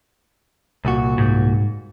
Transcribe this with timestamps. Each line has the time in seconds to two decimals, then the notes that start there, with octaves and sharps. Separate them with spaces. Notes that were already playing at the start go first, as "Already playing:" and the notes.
0.85 C2 A#2 F#4
1.17 G#2